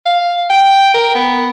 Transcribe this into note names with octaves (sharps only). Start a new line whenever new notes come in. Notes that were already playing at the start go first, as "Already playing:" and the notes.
F5
G5
A#4
B3